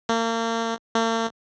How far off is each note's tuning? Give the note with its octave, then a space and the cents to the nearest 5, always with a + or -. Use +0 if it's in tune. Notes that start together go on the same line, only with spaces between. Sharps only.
A#3 -35
A#3 -45